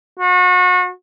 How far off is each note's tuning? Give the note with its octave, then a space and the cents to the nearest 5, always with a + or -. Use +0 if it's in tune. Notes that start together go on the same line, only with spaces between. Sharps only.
F#4 -35